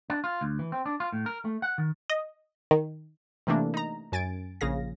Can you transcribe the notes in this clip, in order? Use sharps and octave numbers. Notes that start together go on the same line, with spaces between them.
D4
F4
D2
E3
C4
D4
F4
A2
A#4
A3
F#5
D#3
D#5
D#3
C3 E3 A3 A#3 D4 A#4
D#4 A#5
F#2 G#5 A6 D7
A#1 C#3 G#4 F5 A#6